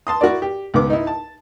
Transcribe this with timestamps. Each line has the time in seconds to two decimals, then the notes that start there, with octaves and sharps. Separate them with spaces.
0.07 A5 C6 D#6
0.21 E4 F#4 A#4 D5
0.42 G4
0.74 C#2 G#2 B3 D6
0.90 D#4 E4
1.07 A5